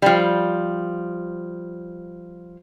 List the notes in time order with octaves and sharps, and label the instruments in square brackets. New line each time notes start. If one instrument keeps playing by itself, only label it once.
[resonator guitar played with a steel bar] F3 G3